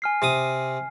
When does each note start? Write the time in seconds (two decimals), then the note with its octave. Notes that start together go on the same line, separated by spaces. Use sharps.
0.02 G#5 F6 C7
0.22 C3 D6 D#6